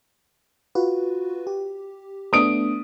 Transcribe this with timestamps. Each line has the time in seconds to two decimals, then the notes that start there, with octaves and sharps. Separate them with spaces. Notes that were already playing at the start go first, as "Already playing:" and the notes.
0.75 F4 F#4 B4
1.47 G4
2.33 A3 B3 D4 D#6 D7